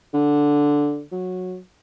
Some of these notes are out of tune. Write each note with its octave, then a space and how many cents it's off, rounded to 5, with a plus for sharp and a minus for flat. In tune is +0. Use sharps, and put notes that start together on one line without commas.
D3 -5
F#3 -15